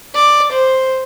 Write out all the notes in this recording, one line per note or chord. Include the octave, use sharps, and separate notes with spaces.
D5
C5